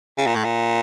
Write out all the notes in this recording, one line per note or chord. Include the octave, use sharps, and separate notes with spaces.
C#3
A#2
A2
A#2